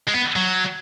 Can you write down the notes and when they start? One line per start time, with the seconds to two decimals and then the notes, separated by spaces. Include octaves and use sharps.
0.08 G#3
0.14 B3
0.36 F#3